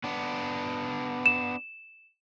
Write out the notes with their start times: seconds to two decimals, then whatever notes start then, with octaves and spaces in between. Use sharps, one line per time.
0.04 B3 D4
1.26 E7